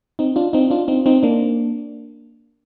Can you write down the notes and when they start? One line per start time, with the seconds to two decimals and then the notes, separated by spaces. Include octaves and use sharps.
0.19 C4 D#4
0.36 D4 F4
0.53 C4 D#4
0.70 D4 F4
0.88 C4 D#4
1.06 C4 D#4
1.23 A#3 D4